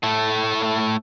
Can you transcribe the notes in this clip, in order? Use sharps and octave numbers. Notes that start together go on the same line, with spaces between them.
A2 A3